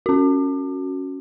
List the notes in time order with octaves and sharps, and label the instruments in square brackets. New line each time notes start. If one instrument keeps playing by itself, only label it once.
[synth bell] C#4 F#4